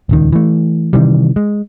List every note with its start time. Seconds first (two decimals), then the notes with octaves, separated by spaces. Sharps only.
0.09 D#1 C#2 D#3
0.33 E3 A3
0.93 C3 D#3 E3 G3
1.36 G#3